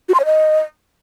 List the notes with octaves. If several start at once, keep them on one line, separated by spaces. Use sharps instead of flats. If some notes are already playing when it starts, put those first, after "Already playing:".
F#4
C6
C#5
D#5